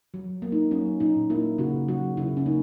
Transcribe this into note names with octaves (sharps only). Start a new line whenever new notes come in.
F#3
A#3
D#4
F#3 C#4
A#2 D#4
A#3 E4
C#3 F#4
F#3 F#4
C#3 E4
C#4
A#3 D#4